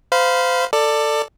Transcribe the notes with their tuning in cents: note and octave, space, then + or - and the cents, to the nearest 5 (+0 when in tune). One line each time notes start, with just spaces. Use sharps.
C5 -30 F5 +0 B5 -20
A4 +20 D5 +10